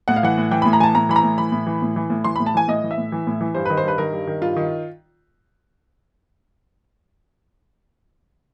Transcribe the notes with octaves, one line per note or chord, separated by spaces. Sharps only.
A2 F#5
F5
E3 F#5
A2
E3 G5
A2 B5
A#5
E3 G#5 A5
A2 A#5
E3 B5
A#5
A2
E3 B5
A2
E3
A2
E3
A2
E3 C6
A2 B5
A5
E3 G#5
A2 D#5
E3
E5
A2
E3
A2
E3
G2 C5
D#3 B4
C5
G2 B4
D#3 A#4
G2
D#3
G2 F4
D#3